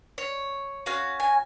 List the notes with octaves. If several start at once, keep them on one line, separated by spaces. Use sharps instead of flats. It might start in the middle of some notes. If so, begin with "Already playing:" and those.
C#5
C#4 F#4 F5
G#5